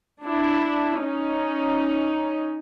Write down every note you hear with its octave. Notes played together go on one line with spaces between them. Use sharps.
D4 E4
C#4 D#4